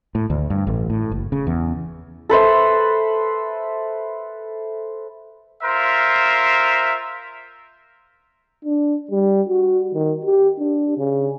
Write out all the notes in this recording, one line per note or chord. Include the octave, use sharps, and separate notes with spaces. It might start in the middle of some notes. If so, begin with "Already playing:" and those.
A2
D2
G2
A1
A2
F#1
C#3
E2
A4 B4 C5 E5
F4 A#4 C5 E5
D4
G3
F#4
D#3
G4
D4
C#3